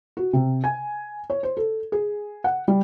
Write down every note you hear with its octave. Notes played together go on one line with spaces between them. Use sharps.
F#4
C3
G#5
C#5
C5
A4
G#4
F#5
G3